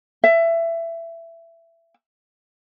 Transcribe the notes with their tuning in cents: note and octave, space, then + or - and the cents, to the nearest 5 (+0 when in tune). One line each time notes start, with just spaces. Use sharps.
E5 +20